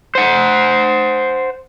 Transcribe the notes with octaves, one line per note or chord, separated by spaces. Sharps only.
C5 F#5